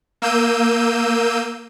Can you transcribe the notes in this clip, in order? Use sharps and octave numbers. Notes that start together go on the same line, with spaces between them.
A#3 E6 G6 D#7